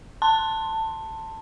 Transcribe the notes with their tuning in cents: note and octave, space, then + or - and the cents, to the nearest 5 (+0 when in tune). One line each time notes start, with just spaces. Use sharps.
A5 +15 C6 +5